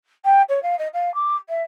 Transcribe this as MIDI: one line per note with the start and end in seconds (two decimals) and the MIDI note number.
0.25 0.42 79
0.49 0.62 73
0.63 0.78 77
0.78 0.88 75
0.93 1.13 77
1.15 1.36 86
1.49 1.62 76